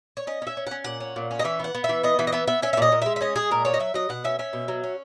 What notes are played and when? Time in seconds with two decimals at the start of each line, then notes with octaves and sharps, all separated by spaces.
0.17 C#5
0.27 C#4 D#5
0.42 C#4 E5
0.57 C#4
0.67 F#5
0.71 C#4
0.84 A#2 F#5
1.00 C#4
1.16 A#2
1.31 C#4
1.39 D#5
1.44 E3 E5
1.60 B3 F#5
1.75 B3
1.84 E5
1.89 E3
2.03 B3 D#5
2.19 E3 E5
2.27 D#5
2.32 B3 E5
2.47 B3 E5
2.62 C#4 E5
2.73 E5
2.77 A#2 D#5
2.92 A#2
3.02 G#3 E5
3.16 E5
3.21 C#4 D#5
3.36 G#3 G#4
3.51 A#2 A#4
3.65 A#2 C#5
3.74 D#5
3.79 F#3 E5
3.94 F#3 D#5
4.09 B2 F#5
4.24 C#4 E5
4.39 C#4 E5
4.53 B2
4.68 F#3
4.84 C#4